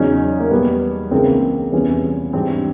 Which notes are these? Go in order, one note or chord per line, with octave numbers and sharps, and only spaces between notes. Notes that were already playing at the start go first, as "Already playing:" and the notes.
Already playing: E2 C#3 F#3 C#4 D#4
A#3
E2 B2 G3 B3
C#2 C#3 E3 A#3 C4
E2 C3 E3 G3 B3 C#4
G#2 E3 G3 C4 D4